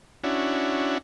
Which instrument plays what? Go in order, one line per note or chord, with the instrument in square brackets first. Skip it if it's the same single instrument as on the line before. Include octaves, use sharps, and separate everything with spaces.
[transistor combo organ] C#4 D4 E4 F#4